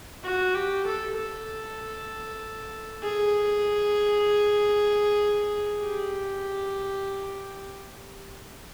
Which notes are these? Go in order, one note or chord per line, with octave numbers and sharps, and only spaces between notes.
F#4
G4
A4
A4
G#4
G4